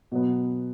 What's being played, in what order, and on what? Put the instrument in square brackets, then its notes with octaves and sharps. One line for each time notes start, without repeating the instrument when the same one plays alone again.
[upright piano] B2 F#3 B3